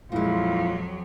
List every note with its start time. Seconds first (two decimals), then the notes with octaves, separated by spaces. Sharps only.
0.12 F2 A#2 F#3 G#3 E4 F4